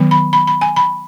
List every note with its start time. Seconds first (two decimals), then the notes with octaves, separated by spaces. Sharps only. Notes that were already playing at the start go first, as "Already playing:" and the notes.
Already playing: D#3 F#3 B3
0.11 B5
0.33 B5
0.47 B5
0.61 G#5
0.76 B5